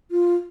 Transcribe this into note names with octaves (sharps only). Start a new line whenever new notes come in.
F4